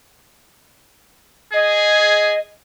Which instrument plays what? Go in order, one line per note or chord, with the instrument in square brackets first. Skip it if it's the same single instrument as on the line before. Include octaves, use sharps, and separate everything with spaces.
[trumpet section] G#4 [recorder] D#5